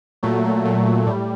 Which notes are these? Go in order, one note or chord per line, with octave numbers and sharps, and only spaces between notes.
A#2 F#3 A3
F#3
A#2
F#3
A2 G3